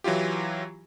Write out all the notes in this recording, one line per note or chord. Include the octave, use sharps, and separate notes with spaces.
E3 F#3 E4 F4 G4